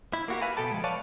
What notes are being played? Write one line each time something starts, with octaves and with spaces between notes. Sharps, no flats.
E4
A#3 F#4 G4
B4 E5 F5 G#5 B5
B2 B3 A4 G5 A5 B5
F3 G#3
B4 C#5 D5 F5 G#5 A5